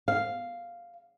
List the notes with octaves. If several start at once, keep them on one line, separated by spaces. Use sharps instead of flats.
F5